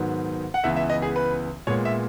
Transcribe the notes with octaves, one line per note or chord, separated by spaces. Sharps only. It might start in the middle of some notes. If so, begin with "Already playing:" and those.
Already playing: G#2 D#3 F#3 B3
F#5
C#2 C#3 E3 B3 E5
E5
D#5
G#4
B4
A#2 G#3 B3 C#5
E5